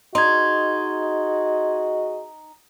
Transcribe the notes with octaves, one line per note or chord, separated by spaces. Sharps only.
D#4 F#4 G#4 D#5 C6 G#6